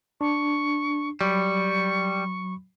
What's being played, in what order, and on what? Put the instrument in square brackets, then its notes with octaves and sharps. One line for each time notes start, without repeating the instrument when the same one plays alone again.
[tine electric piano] D4 [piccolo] C#6
[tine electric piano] F#3 B5 [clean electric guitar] G3 [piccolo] C#6